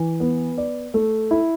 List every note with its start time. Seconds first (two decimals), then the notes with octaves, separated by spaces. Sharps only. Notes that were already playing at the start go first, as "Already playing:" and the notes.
Already playing: E3
0.20 B3
0.58 D5
0.94 A3
1.31 E4